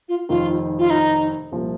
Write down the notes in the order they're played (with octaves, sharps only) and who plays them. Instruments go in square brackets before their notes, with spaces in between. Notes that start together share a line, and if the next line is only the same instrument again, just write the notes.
[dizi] F4
[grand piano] F1 F2 D#3 [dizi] F4
[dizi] F4
D#4
[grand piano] C2 A#2 F3